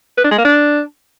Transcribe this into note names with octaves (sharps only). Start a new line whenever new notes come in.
B4
D4
G#3
A#3
D4